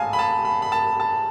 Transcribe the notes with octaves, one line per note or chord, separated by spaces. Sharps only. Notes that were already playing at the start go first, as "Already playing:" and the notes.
Already playing: A1 G#2 F5 G#5 A5
B5
A5
B5
B5
A5
A5